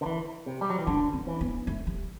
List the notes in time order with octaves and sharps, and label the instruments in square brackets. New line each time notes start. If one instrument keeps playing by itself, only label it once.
[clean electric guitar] D3
[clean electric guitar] E3 [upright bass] C4
[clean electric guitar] C3
G3
F#3
E3
[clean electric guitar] D3 [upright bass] D4
[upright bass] C4
[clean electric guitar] E3
[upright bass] B3
A3
G3